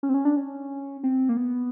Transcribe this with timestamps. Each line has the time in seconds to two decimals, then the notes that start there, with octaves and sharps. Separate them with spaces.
0.03 C#4
0.09 C4
0.14 C#4
0.25 D4
0.36 C#4
1.03 C4
1.29 A#3
1.37 B3